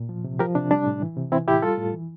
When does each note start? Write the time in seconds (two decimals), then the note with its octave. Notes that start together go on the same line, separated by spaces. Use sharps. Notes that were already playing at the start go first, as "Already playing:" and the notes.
Already playing: A#2
0.09 F3
0.24 C3
0.39 F3 G4 A#4
0.55 C3 D4
0.71 G3 D4
0.86 A2
1.02 E3
1.17 C3
1.32 E3 C4 E4
1.47 A2 E4 G4
1.62 G3 F4 A4
1.78 A2
1.93 E3